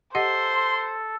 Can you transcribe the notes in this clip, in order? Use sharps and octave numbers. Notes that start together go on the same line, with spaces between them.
G4 A4 C5 D#5 F#5 C6